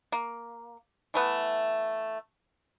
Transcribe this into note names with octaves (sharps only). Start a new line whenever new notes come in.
A#3
E3 A3 B3